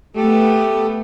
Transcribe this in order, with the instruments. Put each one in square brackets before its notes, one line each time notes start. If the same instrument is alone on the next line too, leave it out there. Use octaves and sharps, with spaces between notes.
[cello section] A3 B3 [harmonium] G4 A4